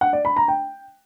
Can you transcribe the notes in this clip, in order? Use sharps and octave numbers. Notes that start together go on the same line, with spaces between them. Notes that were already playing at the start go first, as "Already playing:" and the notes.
F#5
D5
B5
A#5
G5